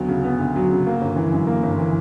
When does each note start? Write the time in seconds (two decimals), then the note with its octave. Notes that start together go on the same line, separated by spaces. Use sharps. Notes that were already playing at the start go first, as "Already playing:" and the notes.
Already playing: D2 F#3 B3
0.09 C#3
0.24 B3
0.39 D2
0.56 F#3
0.70 C#3
0.87 A#3
1.01 G1
1.16 E3
1.32 F#2
1.47 A#3
1.63 G1
1.79 E3